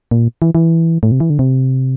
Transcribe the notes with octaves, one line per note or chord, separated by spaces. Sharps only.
A#2
E3
E3
A2
C3
E3
D3
C3